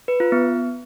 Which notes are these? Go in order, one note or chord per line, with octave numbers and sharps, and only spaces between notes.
B4
F4
B3